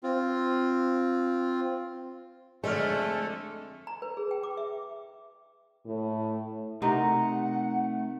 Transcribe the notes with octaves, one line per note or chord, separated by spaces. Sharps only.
C4 F4
F2 D3 G#3 A3 A4 D5 F6
A#5
B4
G#4
G5
D6
E5
A2
C3 A3 D#4 A#4 F#5